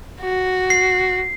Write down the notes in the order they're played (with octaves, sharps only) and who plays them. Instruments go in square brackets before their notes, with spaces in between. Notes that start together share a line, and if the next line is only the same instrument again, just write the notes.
[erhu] F#4
[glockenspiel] C7